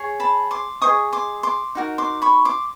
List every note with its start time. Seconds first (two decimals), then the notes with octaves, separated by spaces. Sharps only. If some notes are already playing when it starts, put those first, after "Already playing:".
Already playing: G#4 C#5
0.20 A5 B5
0.51 C6 D6
0.82 C5 D#5 C#6 D#6
0.86 G#4
1.13 C6 D6
1.43 C6 D6
1.75 D#4 F#4 A#4
1.98 C6 D6
2.22 B5 C#6
2.45 C6 D6